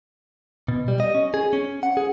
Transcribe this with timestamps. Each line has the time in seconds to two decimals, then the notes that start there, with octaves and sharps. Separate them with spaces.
0.68 B2
0.88 G3
1.00 D#5
1.15 C#4
1.34 G#4
1.53 C#4
1.83 F#5
1.97 G#4